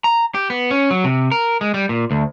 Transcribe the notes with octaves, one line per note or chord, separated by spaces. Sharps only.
A#5
G4
B3
C#4
F#3
C3
A#4
G#3
G3
A#2
D2